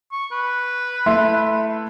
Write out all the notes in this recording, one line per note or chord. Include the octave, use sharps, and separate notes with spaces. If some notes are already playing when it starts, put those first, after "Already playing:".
C#6
B4
A3 E4 C6